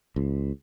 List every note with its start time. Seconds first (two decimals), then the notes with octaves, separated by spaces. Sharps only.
0.16 C#2